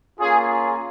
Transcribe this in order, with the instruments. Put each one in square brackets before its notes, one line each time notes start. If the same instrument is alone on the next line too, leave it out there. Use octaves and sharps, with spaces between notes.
[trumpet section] A#3 C#4 F4 G#4